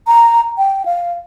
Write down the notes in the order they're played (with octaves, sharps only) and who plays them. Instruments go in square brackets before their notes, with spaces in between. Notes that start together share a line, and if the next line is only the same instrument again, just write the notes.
[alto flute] A#5
G5
F5